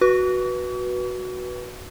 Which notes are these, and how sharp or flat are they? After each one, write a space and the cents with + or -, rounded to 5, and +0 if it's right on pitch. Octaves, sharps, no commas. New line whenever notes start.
F#4 +0 B4 -15 C#6 +45